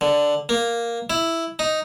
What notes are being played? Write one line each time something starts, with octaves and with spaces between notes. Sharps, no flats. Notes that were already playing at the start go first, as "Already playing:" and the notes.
D3
A#3
E4
D#4